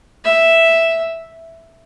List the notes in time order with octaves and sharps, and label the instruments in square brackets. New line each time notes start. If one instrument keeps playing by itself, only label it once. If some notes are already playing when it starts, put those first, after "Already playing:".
[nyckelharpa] E5